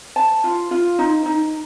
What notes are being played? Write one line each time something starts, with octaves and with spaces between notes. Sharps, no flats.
A5
F4
F4
D#4
D#4